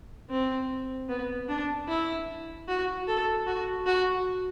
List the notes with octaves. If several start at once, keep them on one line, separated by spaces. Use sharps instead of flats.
C4
B3
D4
E4
F#4
A4
F#4
F#4